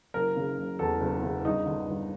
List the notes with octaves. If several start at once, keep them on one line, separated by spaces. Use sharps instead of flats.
F#1 A#4
C#3
F#1
E2 A4
F#1
C#3
G1 D#4
D3
G1